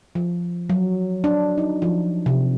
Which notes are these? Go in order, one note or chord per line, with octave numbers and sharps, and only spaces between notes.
F3
F#3
D4
D#4
F3
C3